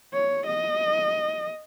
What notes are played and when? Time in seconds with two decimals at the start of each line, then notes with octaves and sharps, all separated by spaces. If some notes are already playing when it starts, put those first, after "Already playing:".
0.13 C#5
0.46 D#5